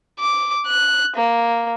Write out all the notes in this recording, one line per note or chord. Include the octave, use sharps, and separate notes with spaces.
D6
F#6
A#3